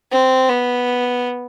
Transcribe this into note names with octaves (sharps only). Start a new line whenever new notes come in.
C4
B3